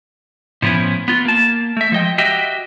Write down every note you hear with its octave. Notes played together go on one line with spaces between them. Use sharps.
A2 F3 B3 C#4 E4
B3 F4
A#3 A5
A3 E5
F3 G#3 D#5 G5
F#4 G4 D#5 E5 G5